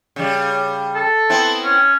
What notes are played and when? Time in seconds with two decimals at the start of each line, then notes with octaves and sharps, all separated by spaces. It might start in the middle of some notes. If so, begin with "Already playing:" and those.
0.16 C#3 G3
0.95 A4
1.30 B3 C4 E4
1.64 C#4